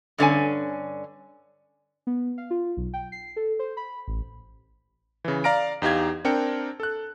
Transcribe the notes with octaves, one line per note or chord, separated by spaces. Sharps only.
G2 D3 C#4 G#5
B3
F5
F4
B1
G5
C7
A4
C5
B5
A1
C#3 E3
D5 F5 A#5 F6 A#6 D7
E2 D#4 G4 F5 G#6
C4 D4 A#4 G5 C#7
A4 F#6